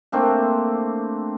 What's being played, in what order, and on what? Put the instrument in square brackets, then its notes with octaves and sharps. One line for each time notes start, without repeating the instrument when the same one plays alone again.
[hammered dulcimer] A3 A#3 C4 D4